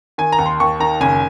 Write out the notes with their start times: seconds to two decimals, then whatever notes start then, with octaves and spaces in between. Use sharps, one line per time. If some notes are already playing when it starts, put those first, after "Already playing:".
0.18 D#3 G#5
0.32 A#5
0.38 D#2
0.46 C6
0.60 D#2 C#6
0.80 D#3 A#5
1.01 F#1 G#5